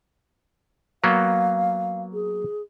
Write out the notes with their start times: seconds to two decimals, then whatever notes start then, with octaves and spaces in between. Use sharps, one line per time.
1.04 F#3 A#3 B3 F5
2.13 G#4